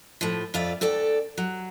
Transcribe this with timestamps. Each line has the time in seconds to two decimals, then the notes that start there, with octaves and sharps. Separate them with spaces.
0.21 A2 F3
0.54 F2 F4 D5 E5
0.81 D2 A4 D5 G5
1.38 F#3